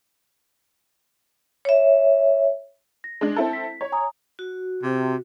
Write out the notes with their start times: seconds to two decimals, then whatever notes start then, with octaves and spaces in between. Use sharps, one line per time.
1.65 C#5 E5
3.04 A#6
3.21 G#3 D4
3.36 C4 E4 A4 A5
3.53 B6
3.81 C#5
3.92 G#5 A#5 D#6
4.39 F#4
4.83 C3